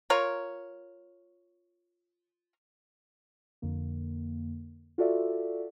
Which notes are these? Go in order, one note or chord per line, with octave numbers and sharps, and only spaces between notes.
F4 A#4 C#5
F2 D3 A#3
F4 F#4 A4 D5 E5